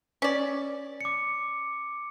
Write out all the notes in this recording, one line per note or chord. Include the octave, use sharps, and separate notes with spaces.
C#4 D5
D6 C#7